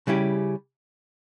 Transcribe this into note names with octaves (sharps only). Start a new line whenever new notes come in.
C#3 G3 C#4 E4 G4